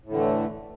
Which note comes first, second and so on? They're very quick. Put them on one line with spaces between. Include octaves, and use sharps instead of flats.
A2 D3 E3 A3